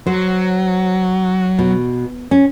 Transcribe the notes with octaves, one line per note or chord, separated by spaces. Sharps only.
F#3 C5
B2
C#4